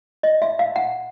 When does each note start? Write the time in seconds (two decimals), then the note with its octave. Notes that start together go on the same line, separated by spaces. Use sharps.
0.23 D#5
0.42 E5
0.59 F5
0.76 F#5